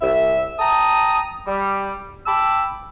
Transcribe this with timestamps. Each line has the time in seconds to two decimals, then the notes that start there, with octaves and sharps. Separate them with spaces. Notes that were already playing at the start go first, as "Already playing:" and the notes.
0.02 C2 E5
0.60 G5 A5 A#5 D#6
1.48 G3
2.27 G5 A5 B5 D6 E6